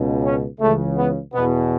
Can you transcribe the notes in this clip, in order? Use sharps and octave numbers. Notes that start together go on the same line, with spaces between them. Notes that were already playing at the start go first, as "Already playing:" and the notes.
Already playing: C#2 B2
C#4
C#2 C#3 E3 A3
B3
E2 B2 B3